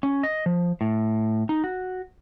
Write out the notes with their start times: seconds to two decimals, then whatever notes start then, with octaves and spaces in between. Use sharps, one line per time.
0.03 C#4
0.23 D#5
0.46 F3
0.81 A2
1.49 D#4
1.64 F#4